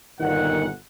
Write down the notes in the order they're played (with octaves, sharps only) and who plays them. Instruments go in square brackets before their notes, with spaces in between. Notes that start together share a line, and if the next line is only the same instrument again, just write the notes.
[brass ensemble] G1 A#2 F#5 [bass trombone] D#3